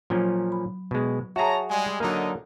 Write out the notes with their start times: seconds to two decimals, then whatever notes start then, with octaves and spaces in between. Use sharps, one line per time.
0.10 A#2 F3 F#3 C#4
0.52 B5
0.91 B2 G#3
1.36 F#4 G#4 C#5 E5 A5 A#5
1.70 G3 G#3 G#5
2.00 D3 F#3 A#3 D#4